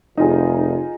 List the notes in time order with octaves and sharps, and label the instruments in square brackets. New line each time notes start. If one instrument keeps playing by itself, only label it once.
[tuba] F1 [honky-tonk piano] D#4 F4 G#4